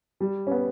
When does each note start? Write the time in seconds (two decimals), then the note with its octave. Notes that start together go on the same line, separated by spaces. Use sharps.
0.20 G3
0.47 C#4
0.51 B3